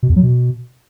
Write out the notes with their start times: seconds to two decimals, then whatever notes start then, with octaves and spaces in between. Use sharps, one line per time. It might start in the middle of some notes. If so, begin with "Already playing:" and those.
0.03 B2
0.09 E2
0.16 F#3
0.23 B2